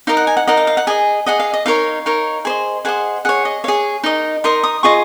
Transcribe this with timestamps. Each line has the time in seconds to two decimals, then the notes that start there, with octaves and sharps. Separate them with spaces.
0.07 D#4 A#4 D#5 F5
0.17 F#5
0.27 G#5
0.37 F#5
0.48 D#4 A#4 D#5 F#5
0.57 F5
0.67 F5
0.77 F#5
0.87 G#4 D#5 G#5
1.26 G#4 D#5 F#5
1.40 F5
1.54 D#5
1.66 D#4 A#4 C#5 F5
2.06 D#4 A#4 C#5
2.45 G#4 C5 D#5
2.85 G#4 C5 D#5 F#5
3.25 G#4 C#5 F#5
3.45 D#5
3.64 G#4 C#5 F5
4.04 D#4 A#4 D#5
4.44 D#4 A#4 D#5 C6
4.64 D#6
4.83 F4 G#4 D#5 C#6